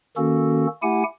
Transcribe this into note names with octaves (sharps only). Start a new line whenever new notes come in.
D#3 A#3 C#4 F#4 A4
A3 E4 G4 F#5 G#5